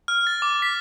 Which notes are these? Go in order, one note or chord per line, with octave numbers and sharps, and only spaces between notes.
F6
A6
D6
B6